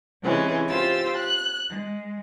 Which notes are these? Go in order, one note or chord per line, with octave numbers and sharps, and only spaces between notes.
C3 E3 G#3 C#4
F4 G4 C5 E6 A6
F#6
G#3